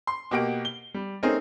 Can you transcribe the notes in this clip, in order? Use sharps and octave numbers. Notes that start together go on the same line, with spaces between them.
C6
B2 A#3 G4 F#5 D7
G7
G3
A3 C4 C#4 D#4 G#4 A#4